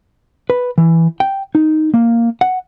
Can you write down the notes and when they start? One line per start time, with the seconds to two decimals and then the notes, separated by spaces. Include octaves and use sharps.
0.50 B4
0.78 E3
1.20 G5
1.55 D#4
1.94 A#3
2.41 F#5